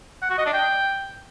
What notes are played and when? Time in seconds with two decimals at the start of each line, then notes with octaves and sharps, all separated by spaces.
0.22 F#5
0.30 F#4
0.38 D#5
0.46 D4
0.54 G5